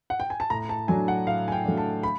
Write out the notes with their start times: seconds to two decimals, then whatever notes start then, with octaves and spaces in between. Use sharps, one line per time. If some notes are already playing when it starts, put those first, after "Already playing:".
0.10 F#5
0.20 G5
0.30 G#5
0.40 A5
0.50 A2 A#5
0.69 A5
0.88 F#3 A3 D4 G#5
1.08 F#5
1.27 A2 F5
1.48 G#5
1.52 G5
1.65 F#3 A3 D4
1.77 A5
2.03 B5